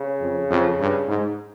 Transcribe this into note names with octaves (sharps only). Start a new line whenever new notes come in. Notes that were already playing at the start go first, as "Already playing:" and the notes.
Already playing: C#3
F2
F2
G2
G#2